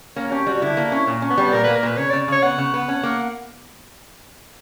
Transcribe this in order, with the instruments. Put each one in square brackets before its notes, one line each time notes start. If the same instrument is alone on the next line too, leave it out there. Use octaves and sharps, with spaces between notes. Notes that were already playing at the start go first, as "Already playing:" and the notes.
[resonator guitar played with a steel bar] A#3 [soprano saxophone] C#4
[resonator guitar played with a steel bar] C#4 [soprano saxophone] G4
[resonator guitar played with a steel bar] G3 [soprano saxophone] F#4
[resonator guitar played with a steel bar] D3 [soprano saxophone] E4
[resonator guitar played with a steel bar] A#3
[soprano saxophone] E4
[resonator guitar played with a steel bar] C#4
A#2
C#4
[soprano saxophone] B3
[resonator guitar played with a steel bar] G3
[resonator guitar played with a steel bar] A#2 [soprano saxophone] A#4
[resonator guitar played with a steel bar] A#3 [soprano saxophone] B4
[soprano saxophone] A#4
[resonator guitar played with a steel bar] A#2 [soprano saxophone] B4
[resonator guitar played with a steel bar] C#3 [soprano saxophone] C#5
[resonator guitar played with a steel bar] C#3 [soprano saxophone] D5
[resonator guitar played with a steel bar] C#3 [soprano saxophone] C#5
[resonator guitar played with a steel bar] B3 [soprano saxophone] F#5
[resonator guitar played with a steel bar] C#3
B3
C#4
A#3